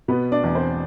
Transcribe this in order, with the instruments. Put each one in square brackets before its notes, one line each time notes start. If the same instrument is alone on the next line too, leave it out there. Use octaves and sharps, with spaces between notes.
[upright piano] B2 B3 B4
D4 D5
E2
C4 C5